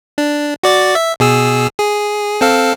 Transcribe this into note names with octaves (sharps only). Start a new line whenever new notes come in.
D4
F#4 D5 A6
E5
B2 G#4 E6
G#4
C4 A4 F5